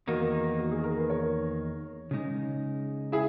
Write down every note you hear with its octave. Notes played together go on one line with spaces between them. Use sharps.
E2 D#3 A#3 D#4 F#4 A#4
F#4
G#4
A#4
B4
A#4 C#5
C#3 G#3 D#4
E4 G#4